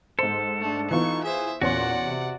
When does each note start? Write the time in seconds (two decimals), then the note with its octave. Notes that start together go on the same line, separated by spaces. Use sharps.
0.19 G#2 A4 C5
0.61 A3 D4
0.91 E3 B3 D#4 F4 C#6
1.24 G#4 C5 E5
1.62 E2 A#2 C#4 F#4 D5 F#5 C6
2.01 C3